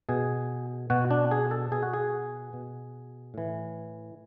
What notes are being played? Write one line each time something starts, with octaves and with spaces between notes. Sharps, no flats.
B2 G#4
B2 F#4
D4
G#4
A4
B2 G#4
F#4
G#4
B2
A2 E3